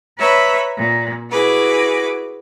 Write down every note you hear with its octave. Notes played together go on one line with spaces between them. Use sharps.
B4 C#5 E5 A#5 B5
A#2
E4 F#4 G#4 B4 D6